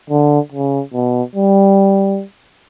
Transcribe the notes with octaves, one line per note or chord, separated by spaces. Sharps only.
D3
C#3
B2
G3